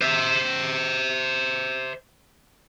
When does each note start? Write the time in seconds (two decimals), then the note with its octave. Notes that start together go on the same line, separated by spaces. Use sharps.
0.02 C5 E5